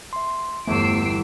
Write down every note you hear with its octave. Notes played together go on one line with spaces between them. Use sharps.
E5 C6
G1 E2 G2 A3 B3 E6 C7 D7